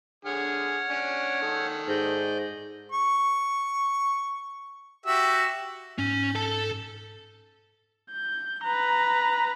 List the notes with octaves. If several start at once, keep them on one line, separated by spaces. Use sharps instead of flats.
D3 G#4 C#5 F#5 F6
C#4 D4 G#5
D#3 A4
G#2 D5 D#5 G6
C#6
F#4 G4 E5
G#2 C#4
A4 A5
G6
B4 A#5